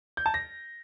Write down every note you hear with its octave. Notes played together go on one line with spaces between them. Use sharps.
G6
A5
A#6